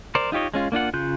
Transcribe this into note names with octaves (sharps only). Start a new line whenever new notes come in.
A#4 C5 D5
D#4 F4 G4 C#5 D#5
G#3 C#4 F4
A#3 D4 F4 F#5
C#3 F4 F#6 G6